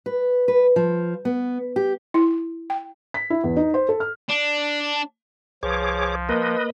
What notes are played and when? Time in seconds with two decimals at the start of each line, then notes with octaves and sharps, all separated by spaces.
0.06 B4
0.48 B4
0.76 F3
1.25 B3
1.76 G4
2.14 E4
2.70 G5
3.14 B6
3.30 E4
3.43 E2
3.56 D#4
3.74 C5
3.89 A4
4.00 F6
4.29 D4
5.63 C2 F3 G#4 B4 C#5 D6
6.29 A#3 A#4 B4 D#5